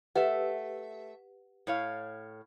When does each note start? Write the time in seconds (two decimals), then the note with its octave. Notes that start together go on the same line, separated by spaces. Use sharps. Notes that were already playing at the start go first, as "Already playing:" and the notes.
0.15 A3 G4 B4 E5 F#5
1.67 A2 C#5 F5